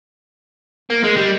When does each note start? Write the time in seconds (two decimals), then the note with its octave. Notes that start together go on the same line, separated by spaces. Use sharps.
0.90 A#3
1.04 G#3
1.17 G3